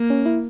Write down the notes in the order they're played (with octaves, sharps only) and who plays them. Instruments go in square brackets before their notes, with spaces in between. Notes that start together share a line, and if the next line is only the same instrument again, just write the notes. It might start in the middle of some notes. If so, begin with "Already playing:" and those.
Already playing: [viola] A#3
[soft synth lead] C#4
E4